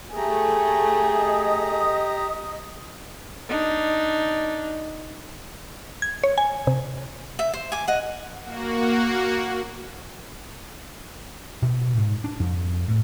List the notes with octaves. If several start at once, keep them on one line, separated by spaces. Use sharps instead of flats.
A3 G4 G#4 A#5
D#5 D#6
D4 D#4
G#6
C#5
G#5
C3
E5
C5
G#5 D6
D#5 F#5
A#3 F#4
B2
G#2
D4
F2
A2